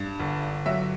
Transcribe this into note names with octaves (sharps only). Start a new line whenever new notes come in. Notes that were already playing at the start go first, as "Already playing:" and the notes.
Already playing: G2
G1
F#3 E5